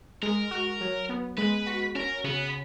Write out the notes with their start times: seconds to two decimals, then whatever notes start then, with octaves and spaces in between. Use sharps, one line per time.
0.22 G#3 A#4
0.51 F#4
0.81 F#3
1.09 B3
1.38 G#3 B4
1.66 F#4
1.95 C#4 A#4
2.24 C#3 B3